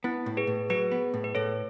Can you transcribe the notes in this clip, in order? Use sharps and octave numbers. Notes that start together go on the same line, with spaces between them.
B3 E4
A2
G#4 B4
A2
F#3 G#4 B4
B3
A2
B4
A2 A4 C#5